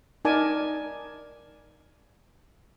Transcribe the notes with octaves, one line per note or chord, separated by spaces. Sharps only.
D#4 A#4 D5 G#5 A5 D6